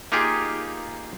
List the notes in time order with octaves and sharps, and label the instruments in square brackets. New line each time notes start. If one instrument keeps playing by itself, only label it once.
[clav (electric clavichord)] A#3 D#4 F4 G4 G#4